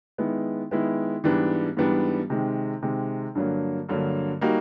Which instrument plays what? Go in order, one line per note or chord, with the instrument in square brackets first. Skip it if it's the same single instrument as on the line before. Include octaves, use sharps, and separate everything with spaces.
[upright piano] D#3 G#3 B3 E4
D#3 G#3 B3 E4
G#2 E3 G3 B3 D4
G#2 E3 G3 B3 D4
C3 D#3 G#3
C3 D#3 G#3
G2 D3 F#3 A#3
G2 D3 F#3 A#3
G3 A#3 D#4 F#4